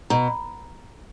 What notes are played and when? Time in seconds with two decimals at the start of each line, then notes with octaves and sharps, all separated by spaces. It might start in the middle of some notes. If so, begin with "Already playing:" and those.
0.10 B2 A#5